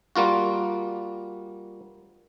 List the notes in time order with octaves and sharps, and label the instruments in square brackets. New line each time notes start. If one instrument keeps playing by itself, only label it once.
[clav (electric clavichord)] G3 A#3 F4 F#4